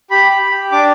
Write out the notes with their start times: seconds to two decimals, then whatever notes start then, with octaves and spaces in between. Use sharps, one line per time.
0.11 G4 B5
0.31 B5
0.41 G4
0.72 D4 D6